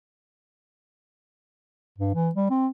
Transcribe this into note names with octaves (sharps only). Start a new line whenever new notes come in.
G2
E3
G3
C4